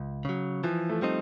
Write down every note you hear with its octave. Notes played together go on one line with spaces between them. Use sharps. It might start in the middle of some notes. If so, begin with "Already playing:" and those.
Already playing: C#2
C#3 F#3
E3 F3
A3
G3 C4 D#4